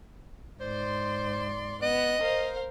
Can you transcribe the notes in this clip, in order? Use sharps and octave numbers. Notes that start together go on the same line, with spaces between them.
G#2 C5 D5 C6
B3 D#5 F#6
A#4 C5 F5